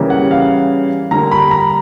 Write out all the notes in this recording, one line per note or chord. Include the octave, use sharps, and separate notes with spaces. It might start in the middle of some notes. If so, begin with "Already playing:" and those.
Already playing: C#3 E3 G3 A#3
F#5
F5
D3 G3 A#3 A#5
B5
A#5